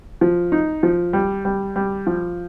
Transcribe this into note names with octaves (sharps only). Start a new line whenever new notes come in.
F3
D#4
F3
G3
G3
G3
F3